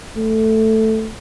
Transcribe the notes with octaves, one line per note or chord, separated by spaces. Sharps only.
A3